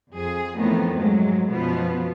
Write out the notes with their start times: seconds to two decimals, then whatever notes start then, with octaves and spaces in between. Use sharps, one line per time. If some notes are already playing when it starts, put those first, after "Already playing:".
0.13 F2 G#4
0.56 F2 A2 D#3 E3 A3 B3
0.97 G#2 F#3 G#3 A3
1.47 F#2 B2 F3 B3